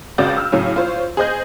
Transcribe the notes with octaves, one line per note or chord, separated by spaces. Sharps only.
C#2 C#3 F#4 D5 G6
E6 F6
A2 C#3 F#3 C#4
F4 C5 C#5
G#4 C5 D#5 G6